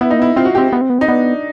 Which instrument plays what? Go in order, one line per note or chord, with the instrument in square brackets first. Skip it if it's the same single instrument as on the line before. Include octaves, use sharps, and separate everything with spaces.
[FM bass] B3 [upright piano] E4
[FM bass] A#3 [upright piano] D#4
[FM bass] B3 [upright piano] E4
[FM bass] C4 [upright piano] F4
[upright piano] F#4
[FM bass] C4 [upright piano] G4
[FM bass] B3
C4
B3
[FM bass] C4 [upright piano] D#4
[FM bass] B3 [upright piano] D4